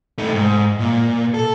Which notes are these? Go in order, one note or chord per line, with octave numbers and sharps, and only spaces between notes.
A3 D#4
G#2
A#2
A4